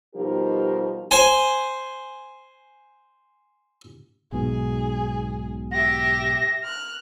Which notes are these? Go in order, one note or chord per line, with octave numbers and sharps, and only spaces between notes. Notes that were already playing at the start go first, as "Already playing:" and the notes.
B2 F3 G3 D#4 G4 A#4
C5 G#5
B1 G#2 B2 G#4
G4 E5 A#6
F6 F#6